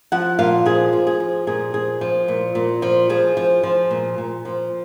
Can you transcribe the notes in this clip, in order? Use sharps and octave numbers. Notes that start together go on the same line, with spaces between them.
F3 F#5
A#2 F5
F3 G#4
F3
G#4
F3
A#2 G#4
F3 G#4
F3
A#2
A#2
F3
F3 G#4
F3
F3
A#2
A#2
F3